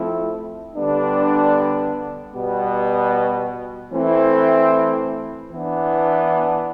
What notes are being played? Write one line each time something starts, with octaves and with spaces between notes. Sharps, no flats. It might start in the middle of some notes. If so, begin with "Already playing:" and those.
Already playing: F3 A3 C4 E4
D3 G3 B3 D4
B2 G3 B3
E3 A3 C4 E4
E3 B3 D4